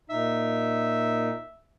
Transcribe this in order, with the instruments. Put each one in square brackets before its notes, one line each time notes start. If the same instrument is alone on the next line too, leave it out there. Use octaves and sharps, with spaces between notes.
[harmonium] A#2 D#4 [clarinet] E5